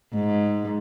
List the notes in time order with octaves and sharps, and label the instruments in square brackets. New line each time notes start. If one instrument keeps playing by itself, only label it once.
[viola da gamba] G#2